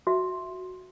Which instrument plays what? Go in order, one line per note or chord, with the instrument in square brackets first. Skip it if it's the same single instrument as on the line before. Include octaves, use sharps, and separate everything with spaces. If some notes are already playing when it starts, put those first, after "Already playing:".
[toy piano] F#4 E5